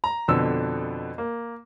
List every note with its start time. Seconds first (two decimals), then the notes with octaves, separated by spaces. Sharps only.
0.04 A#5
0.28 F2 B2 D3 A4 E6
1.18 A#3